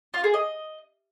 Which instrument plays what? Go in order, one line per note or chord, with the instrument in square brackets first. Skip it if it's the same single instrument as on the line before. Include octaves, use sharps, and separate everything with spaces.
[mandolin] F4
G#4
D#5